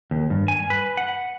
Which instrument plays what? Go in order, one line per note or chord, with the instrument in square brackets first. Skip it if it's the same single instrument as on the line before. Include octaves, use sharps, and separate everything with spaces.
[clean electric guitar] D#2
G2
G#5
B4
F#5